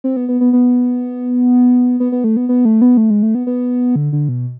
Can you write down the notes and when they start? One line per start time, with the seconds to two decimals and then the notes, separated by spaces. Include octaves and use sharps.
0.04 C4
0.16 B3
0.29 B3
0.41 B3
0.53 B3
2.00 B3
2.12 B3
2.24 A3
2.37 B3
2.49 B3
2.65 A3
2.82 B3
2.97 A3
3.10 G#3
3.23 A3
3.35 B3
3.47 B3
3.96 D3
4.13 D3
4.29 B2